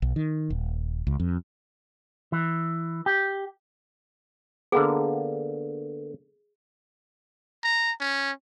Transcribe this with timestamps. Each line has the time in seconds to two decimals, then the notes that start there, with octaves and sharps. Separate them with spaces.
0.02 B1
0.16 D#3
0.50 D#1
1.07 C#2
1.20 F2
2.32 E3
3.06 G4
4.72 D3 A#3 B3 G#4
7.64 A#5
8.00 C#4